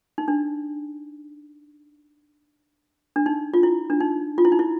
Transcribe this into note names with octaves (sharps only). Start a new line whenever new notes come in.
D#4
D4
D4
D#4
F4
E4
D4
D#4
F4
E4
D#4
E4